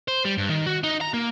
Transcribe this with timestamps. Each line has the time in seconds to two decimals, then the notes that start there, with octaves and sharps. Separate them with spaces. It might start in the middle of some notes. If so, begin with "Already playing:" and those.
0.08 C5
0.25 G3
0.38 G2
0.50 D#3
0.66 F#4
0.84 D#4
1.01 A#5
1.14 A#3